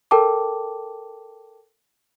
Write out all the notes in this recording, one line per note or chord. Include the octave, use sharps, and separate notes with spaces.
A4 A#4 G5 A5 D6